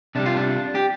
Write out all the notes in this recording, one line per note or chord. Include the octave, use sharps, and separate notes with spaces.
C3 G3 D4
F4
D4
G4